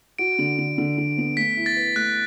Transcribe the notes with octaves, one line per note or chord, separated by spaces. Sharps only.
F#4 D7
D3
D3
D3
D3
B3
A3 B6
E4
A6
B4
A3 F#6